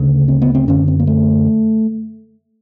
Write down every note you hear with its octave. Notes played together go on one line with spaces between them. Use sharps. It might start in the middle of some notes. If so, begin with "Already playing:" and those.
Already playing: D2 C#3 C#4
C4
B3
C4
F#2 D3 C#4
C4
A#3
A3